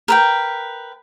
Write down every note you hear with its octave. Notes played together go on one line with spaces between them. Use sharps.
A#4 B4 G5